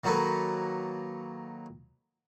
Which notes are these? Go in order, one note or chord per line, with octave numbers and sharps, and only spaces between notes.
D#3 F#3 A#3 A4 B4